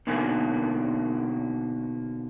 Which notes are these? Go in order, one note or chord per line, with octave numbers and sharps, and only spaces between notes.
B2 D3 D#3 A#3 G#5